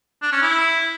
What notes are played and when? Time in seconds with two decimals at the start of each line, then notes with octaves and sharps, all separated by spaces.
0.22 D4
0.32 C#4
0.42 E4